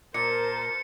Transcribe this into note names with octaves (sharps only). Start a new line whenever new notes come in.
A#2 A#4 C5 A5 C#7